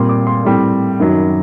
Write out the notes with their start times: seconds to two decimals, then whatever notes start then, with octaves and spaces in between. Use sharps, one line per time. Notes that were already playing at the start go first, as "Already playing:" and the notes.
Already playing: A#2 G3 C4 C6
0.09 D6
0.27 C6
0.45 A2 G3 C4
1.00 F#2 D#3 F#3